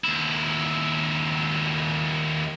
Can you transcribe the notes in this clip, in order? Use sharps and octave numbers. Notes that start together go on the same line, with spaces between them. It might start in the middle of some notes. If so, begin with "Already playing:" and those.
D#2 E4